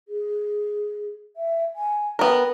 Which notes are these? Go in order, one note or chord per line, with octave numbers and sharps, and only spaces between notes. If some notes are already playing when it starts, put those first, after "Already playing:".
G#4
E5
G#5
B3 A#4 G5